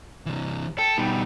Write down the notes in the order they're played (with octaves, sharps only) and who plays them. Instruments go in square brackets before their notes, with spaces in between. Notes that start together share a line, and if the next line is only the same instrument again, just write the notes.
[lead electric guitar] C3 E3
[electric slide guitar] A4 [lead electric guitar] G5
[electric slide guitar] B2 G3 [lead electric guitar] D#4